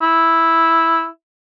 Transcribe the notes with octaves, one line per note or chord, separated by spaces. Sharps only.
E4